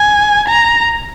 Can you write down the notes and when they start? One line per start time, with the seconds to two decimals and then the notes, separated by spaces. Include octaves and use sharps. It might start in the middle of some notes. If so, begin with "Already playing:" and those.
Already playing: G#5
0.48 A#5